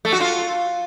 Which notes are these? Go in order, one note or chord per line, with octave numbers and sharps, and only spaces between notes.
A3
F#4
F4